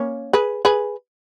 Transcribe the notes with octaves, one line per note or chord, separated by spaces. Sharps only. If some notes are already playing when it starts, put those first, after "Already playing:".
Already playing: A#3 C#4
G#4 B4
G#4 B4